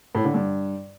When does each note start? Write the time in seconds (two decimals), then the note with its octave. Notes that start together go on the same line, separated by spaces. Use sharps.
0.15 A2
0.24 D3
0.34 G2